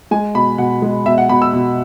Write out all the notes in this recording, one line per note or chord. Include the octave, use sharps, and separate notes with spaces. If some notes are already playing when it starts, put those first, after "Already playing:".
G#3 G#5
B2 B5
B2 F#5
G#3
B2 E5
F#5
B2 B5
E6
B2